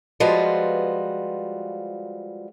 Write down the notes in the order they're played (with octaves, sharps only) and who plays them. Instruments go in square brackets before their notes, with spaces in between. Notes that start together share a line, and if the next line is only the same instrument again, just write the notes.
[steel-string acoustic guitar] F3 G3 G#3 F4 F#4 B4